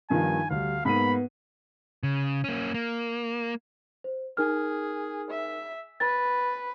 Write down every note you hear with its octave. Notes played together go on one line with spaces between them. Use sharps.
G2 D#3 F3 G3 B3 D#4 G#5
D2 G3 F5
G#2 A#3 B3 B5 D#7
C#3
A#3 C#4
A#3
C5
D#4 G#4 A#4 F6
E5
B4 A6